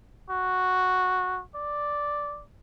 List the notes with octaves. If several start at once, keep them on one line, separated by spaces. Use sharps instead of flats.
F#4
D5